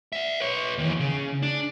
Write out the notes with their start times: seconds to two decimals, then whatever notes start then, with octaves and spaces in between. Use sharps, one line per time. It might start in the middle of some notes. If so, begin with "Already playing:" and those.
0.13 D5 E5
0.40 B4 C#5
0.78 D#2 E3
1.00 C#3
1.43 D4